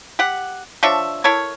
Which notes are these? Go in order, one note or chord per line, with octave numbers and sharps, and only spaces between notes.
G4 F#5
F3 D4 C#5 E5
E4 A4 A#4 C#5